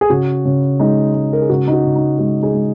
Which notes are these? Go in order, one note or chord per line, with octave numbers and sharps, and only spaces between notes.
G#4
C#3 F#4
C#3
G#3 D#4
G#3
A#4
G#4
C#3 F#4
D#4
F#4
C#3
D#4
G#3 F#4
D#4 G#4
G#3